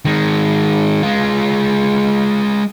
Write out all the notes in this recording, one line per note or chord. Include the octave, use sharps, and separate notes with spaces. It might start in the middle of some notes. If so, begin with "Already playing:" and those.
D#3 G#3
G#3 F4